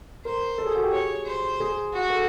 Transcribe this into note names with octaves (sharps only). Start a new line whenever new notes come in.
A#4 C5
A4
G#4
F#4
G4
G#4 C#5
C5
G#4
F#4
A4